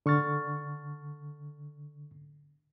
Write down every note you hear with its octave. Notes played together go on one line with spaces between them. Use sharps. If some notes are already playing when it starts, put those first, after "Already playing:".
D3 C#6 F6 A6